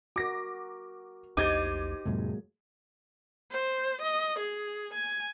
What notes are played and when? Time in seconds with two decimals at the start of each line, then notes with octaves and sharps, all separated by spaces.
0.16 F#4 A#4 D6 A#6
1.37 A#1 E2 D#4 G4 C5 D6 G#6 A6
2.06 F2 A2 C3 F#3 G#3 A#3
3.51 C5
4.02 D#5
4.39 G#4
4.94 G#5